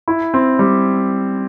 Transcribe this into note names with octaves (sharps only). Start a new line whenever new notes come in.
E4
C4
G3